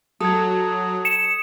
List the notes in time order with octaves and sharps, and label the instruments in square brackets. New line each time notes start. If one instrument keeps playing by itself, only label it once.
[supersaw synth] F#3 [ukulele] A4 [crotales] D#6 G#6
[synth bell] C#7 E7